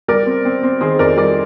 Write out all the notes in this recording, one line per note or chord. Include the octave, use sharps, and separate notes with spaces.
G3 A#4 D5
C4
C4
C4
D#3 G#4 C5
F2 A#4 D5
G3 A#4 D5